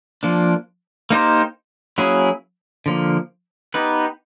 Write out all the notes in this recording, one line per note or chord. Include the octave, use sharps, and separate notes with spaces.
F3 A#3 D4
A#3 D#4 G4 C5
F#3 A#3 C#4 E4 G#4
D3 F3 A#3
B3 D#4 G4 B4